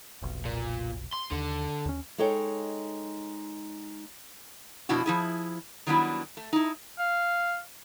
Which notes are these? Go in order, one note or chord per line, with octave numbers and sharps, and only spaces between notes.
F1 B1
A#2
C6
D#2 D3
D#2 C#4
G#3 D#4 A4 C#5 G5
F2 B2 D4 E4 F#4
F3 E4 G#4
D#3 F#3 G3 B3 D4 E4
A3
D#4 E4
F5